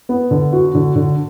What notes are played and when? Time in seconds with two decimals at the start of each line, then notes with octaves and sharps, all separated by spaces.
0.09 B3
0.31 D3
0.53 F#4
0.75 D3
0.96 D3